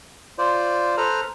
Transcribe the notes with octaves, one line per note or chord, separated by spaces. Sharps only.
F4 C5 D5
A4 B4 C5 A#5 F6